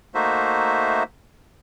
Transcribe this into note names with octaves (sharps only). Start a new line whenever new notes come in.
A3 A#3 D#4 F#4 C5 E5